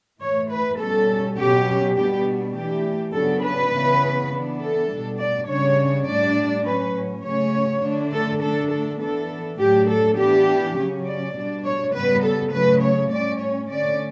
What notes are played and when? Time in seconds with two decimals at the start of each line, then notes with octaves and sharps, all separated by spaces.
0.21 A2 E3 A3 C#5
0.50 B4
0.79 B2 G3 C#4 A4
1.38 B2 F#3 C#4 G4
1.96 B2 G3 B3 D4 G4
2.55 E3 A3 D4 G4
3.14 C#3 F#3 B3 D4 A4
3.43 B4
3.73 C#3 E3 B3
4.31 E3 B3 D4
4.61 A4
4.90 B2 G3 D4
5.19 D5
5.48 C#3 G3 D4 C#5
6.07 A2 G3 D4 D5
6.65 A2 F#3 C#4 B4
7.24 C#3 F#3 A3 C#4 C#5
7.83 D3 A3 D4
8.12 A4
8.42 D3 A3 D4 A4
8.71 A4
9.00 E3 B3 D4 A4
9.59 A2 F#3 A3 D4 G4
9.88 A4
10.18 E3 B3 D4 G4
10.77 C#3 F#3 C#4
11.06 D5
11.35 B2 G3 D4
11.65 C#5
11.93 C#3 G3 B3 B4
12.23 A4
12.52 C#3 F#3 A3 B4
12.82 C#5
13.11 A2 G3 C#4 D5
13.40 C#5
13.69 D3 A3 C#4 D5